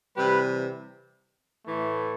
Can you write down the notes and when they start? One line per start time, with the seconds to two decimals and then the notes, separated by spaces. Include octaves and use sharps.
0.15 C3 E3 G3 G4 B4
1.65 A2 E3 A3